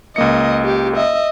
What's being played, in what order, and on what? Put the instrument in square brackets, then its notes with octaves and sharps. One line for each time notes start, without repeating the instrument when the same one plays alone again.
[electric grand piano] C#2 A#3 C#7 [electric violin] D#5
[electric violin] G4
D#5 E5